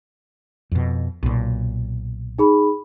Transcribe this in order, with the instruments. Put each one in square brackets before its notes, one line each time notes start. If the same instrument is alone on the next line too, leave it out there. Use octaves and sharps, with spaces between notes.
[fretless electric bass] F2 B2
B1 A#2
[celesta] D#4 G#4 B5